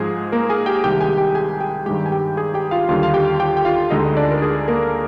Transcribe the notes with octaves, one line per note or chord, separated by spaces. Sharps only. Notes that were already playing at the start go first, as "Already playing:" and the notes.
Already playing: G#2 F3 G#3 G#4
A#3 A#4
G#4 G#5
G4 G5
C2 C3 D#3 G#3 G4 G5
G#4 G#5
G4 G5
G#4 G#5
G4 G5
G2 D#3 G#3 G4 G5
G#5
G4 G5
G#4 G#5
G4 G5
F4 F5
D#2 D3 G3 F4 F5
F5
G4 G5
G4 G5
G5
F4 F5
D2 D3 G#3 D#4 D#5
D4 D5
A#4
G#4
A#3 A#4